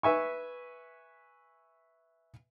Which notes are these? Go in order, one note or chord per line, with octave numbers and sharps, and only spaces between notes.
B4 E5 G#5 C#6